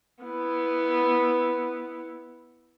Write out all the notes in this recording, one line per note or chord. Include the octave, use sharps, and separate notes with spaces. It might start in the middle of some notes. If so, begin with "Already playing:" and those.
B3 E4